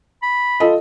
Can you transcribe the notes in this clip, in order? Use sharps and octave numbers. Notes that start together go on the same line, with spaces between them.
B5
F4 A4 D#5